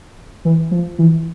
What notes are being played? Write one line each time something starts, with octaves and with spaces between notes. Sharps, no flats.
E3
F3
E3